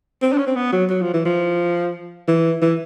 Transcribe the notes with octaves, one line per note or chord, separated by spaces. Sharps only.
C4
D4
C#4
C4
B3
F#3
F#3
F3
E3
F3
E3
E3